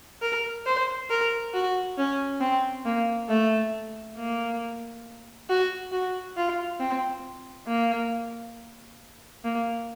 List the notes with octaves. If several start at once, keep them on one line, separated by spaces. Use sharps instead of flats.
A#4
C5
A#4
F#4
C#4
C4
A#3
A3
A#3
F#4
F#4
F4
C4
A#3
A#3